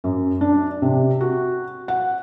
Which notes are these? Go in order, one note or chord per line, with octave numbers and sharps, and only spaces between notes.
F#2
D4
C3
F#4
F#5